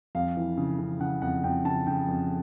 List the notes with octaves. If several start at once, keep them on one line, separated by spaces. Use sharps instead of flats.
F2 F5
E3
C#3
C#3
C#3 F#5
F2 F#5
F2 G5
C#3 A5
C#3 G5
F2